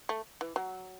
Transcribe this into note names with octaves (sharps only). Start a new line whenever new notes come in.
A3
E3
F#3